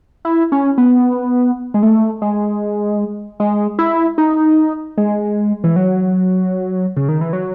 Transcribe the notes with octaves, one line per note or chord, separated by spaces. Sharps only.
E4
C#4
B3
G#3
A3
G#3
G#3
E4
D#4
G#3
E3
F#3
C#3
D#3
E3
F#3